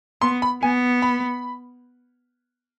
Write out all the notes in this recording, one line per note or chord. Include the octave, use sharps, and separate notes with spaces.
B3 C6
B5
B3 G#5
B5